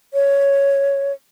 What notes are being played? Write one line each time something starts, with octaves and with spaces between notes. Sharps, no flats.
C#5